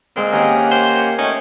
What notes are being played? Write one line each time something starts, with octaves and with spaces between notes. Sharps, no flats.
A#2 G#3 C4
D#3 A#3 C#4 G4 D#5 F#5 G#5 A#5
C5
A3 C#4 D#4 G5